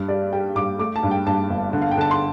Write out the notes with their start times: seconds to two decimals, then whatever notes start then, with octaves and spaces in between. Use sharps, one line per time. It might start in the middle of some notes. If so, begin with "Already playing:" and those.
Already playing: G2
0.08 G3 D5
0.33 G3 G5
0.55 G2 D6
0.79 A3 D6
0.96 A5
1.03 G2
1.11 G5
1.26 G2 A5
1.50 G1
1.73 D3
1.82 F5
1.91 G5
1.98 D3 A5
2.11 C6